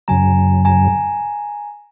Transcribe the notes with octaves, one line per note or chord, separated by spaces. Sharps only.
F#2 C#3 F#3 G#5 A#5
G#5 A#5